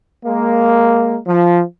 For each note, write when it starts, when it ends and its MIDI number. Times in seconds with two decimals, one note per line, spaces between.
0.24 1.17 56
0.24 1.17 58
1.27 1.61 53